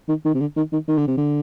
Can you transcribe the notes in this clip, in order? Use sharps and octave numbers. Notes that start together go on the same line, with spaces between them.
D#3
D#3
C3
D3
D#3
D#3
D#3
D3
C3
D3